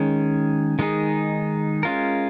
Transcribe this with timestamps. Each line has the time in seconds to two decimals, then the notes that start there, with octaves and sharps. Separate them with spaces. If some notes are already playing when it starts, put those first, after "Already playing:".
Already playing: D#3 G#3 C#4
0.79 D#3 G#3 D#4 G#4
1.83 G#3 C#4 F4 A#4